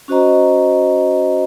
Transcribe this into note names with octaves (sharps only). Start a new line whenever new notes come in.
C#4 F#4 C5 D#5 A#5